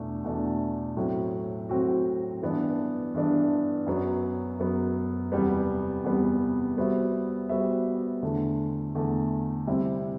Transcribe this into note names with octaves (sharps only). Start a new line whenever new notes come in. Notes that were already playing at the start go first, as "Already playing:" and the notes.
Already playing: E2 B2 A3 D4
E2 B2 A3 D4
A2 F#3 C4 F#4
A2 F#3 C4 F#4
G2 E3 B3 D4
G2 E3 B3 D4
F#2 F#3 B3
F#2 F#3 B3
E2 C3 G3 B3
E2 C3 G3 B3
G3 B3 F#4 C5 E5
G3 B3 F#4 C5 E5
E2 D3 A3
E2 D3 A3
C3 G3 C4 E4